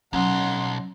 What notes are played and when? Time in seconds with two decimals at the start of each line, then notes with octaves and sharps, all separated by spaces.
0.13 B1 F#3 C#4 F#5 C6